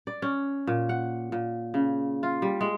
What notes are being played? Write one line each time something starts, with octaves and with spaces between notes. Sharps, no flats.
D5
C#4
A#2
F#5
A#2
C#3
F4
G3
G#3